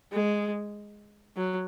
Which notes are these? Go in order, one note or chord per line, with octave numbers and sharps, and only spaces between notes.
G#3
F#3